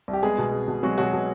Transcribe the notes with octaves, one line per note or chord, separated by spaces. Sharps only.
C2
G4
G#3 B3 G#4
B2
G#3
B2
F#3 G#3 F#4
B2 F#3 F#4
B2